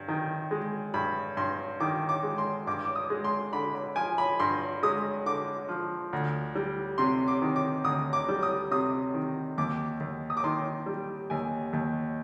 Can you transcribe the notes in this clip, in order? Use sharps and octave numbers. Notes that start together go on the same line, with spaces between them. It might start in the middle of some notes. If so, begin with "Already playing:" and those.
Already playing: G2
D#3
G#3
G2 B5
G2 C6
D#3 D6
D6
G#3
C6
G2 D6
D6
D#6
G#3
C6
D3 B5
B5
F3 G#5
B5
G2 C6
G#3 D#6
D3 D6
F3
D2
G3
C3 C6
D6
D#3
D6
D2 D#6
D6
G3
D#6
C3 D#6
D#3
D#2 D6
D#2
D#6
D6
D#3 C6
G3
D#2 G#5
D#2